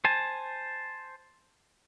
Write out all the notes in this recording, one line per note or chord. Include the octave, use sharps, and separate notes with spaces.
C5 G#5 A5